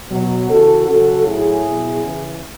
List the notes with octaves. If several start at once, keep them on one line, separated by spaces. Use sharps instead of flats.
B2 F#3
C#3 E3 F#4 A4
C#3 F#3 F#4 A4
A2 F#3 E4 G#4
B2 F#3
C#3 E3